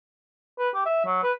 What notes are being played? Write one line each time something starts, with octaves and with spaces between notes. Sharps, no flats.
B4
G4
E5
F#3
B4